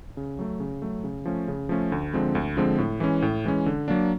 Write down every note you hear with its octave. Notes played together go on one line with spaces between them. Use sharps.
C#3
F#3 A3
C#3
F#3 A3
C#3
F3 A3 C#4
C#3
F3 A3 C#4
D2
D3 F3 G#3 C4
D2
D3 F3 G#3 C4
A2
E3 G#3 C#4
A2
E3 G#3 C#4
D3
F#3 A#3 D4